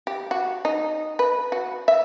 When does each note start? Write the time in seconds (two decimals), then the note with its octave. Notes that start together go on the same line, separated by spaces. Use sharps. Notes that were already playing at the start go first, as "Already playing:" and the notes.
0.07 G4
0.31 F#4
0.65 D#4
1.19 B4
1.52 F#4
1.88 E5